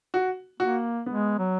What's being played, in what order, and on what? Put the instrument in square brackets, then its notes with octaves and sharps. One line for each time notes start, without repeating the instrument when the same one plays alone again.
[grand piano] F#4
[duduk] A#3 [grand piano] F#4
[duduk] G#3 [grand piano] B3
[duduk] F#3